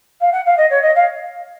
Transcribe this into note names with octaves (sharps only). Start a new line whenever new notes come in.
F5
F#5
F5
D#5
C#5
D#5
F5